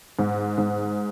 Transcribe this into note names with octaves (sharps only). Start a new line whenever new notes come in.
G#2
G#2